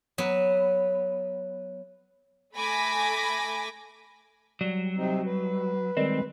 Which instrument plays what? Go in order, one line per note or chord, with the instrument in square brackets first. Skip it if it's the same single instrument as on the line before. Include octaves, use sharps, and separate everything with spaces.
[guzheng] F#3 B3
[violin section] A3 G#5 B5 D6 A#6
[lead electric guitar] F#3 [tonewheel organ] G3
[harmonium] C3 C4 D#4
B4
[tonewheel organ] D#3 G3 G#3 [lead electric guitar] C4